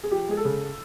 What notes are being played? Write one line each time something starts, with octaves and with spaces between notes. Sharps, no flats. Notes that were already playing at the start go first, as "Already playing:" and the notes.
G#4
F3 G4
G#3 G#4
A4
C#3